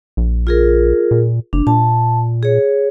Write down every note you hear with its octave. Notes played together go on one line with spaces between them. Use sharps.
A#1
F4 G#4 A#4
A#2
F#1 D4
A#2 A5
G#4 C#5